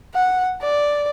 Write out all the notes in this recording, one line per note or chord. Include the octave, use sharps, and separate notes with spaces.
F#5
D5